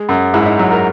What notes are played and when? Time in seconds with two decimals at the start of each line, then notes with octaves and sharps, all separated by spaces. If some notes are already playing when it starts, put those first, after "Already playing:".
Already playing: G#3
0.09 F#2
0.34 G#2 E4
0.46 D#4
0.59 F#3
0.71 A#4